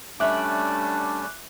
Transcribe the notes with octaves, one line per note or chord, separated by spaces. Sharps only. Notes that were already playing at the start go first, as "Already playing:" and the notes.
G3 A3 C#4 D4 E5 D6 F#6